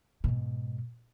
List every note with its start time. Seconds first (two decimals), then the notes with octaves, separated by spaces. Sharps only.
0.24 G#2 B2